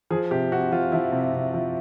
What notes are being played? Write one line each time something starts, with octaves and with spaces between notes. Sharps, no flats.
F3 G#4
C3 G4
C3 F#4
F3 F4
F3 E4
C3
C3
F3